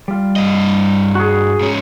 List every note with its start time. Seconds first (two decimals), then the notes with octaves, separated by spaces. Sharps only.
0.08 G3 F4
0.36 G2 D#5
1.15 F#4 G#4
1.61 G#2 C#4